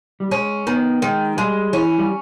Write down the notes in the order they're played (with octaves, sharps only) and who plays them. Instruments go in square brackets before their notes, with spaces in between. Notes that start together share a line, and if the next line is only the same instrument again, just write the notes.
[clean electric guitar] G3
[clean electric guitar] G#3 [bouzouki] C#4
[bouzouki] D#3 [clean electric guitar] B3
[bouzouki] D#3 [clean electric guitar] G#3
[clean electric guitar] G3 [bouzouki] G#3
[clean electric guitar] E3 [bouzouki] C#4
[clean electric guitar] G3